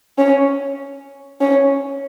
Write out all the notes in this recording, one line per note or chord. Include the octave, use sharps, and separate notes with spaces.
C#4
C#4